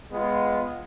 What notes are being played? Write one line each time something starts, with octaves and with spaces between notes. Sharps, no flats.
G#3 B3 F4